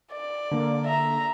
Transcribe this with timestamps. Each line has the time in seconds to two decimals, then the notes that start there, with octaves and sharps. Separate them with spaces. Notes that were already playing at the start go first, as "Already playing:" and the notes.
0.12 D5
0.51 D3 A#3
0.87 E5 A#5